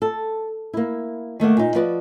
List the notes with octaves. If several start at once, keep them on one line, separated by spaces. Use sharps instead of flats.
A4
A#3 E4
D#3 A3 A#3 F#5
A#2 D#4
F3 F#4 B4 D5 D#5